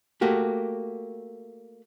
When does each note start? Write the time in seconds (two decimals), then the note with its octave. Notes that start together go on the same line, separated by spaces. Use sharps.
0.21 A3 A#3 F#4 G4